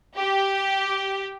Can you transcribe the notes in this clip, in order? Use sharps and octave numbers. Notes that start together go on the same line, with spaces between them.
G4